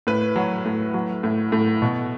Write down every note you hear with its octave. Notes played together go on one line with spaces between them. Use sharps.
A2 B4
F#3
A2
F#3
A2
A2
B2